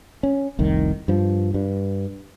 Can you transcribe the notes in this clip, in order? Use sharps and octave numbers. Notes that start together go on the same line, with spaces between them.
C#4
F1 C2 D#3
G2 F3
G2